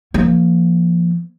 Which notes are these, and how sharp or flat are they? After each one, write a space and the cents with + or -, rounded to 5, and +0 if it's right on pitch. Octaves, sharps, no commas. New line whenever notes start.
F3 -25 A#3 +0